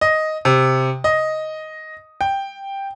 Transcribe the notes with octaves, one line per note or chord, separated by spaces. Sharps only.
D#5
C3
D#5
G5